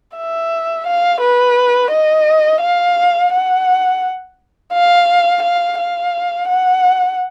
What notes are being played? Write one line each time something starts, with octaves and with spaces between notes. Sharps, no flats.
E5
F5
B4
D#5
F5
F#5
F5
F5
F5
F#5